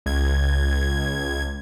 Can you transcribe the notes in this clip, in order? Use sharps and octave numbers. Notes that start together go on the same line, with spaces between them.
C#2 G#6